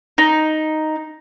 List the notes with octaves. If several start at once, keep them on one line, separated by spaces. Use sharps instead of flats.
D#4